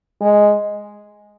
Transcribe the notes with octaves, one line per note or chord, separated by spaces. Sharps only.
G#3